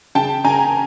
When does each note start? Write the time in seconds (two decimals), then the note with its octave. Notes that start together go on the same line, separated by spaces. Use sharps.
0.15 C#3 G5 A5
0.44 C#3 G#5 A#5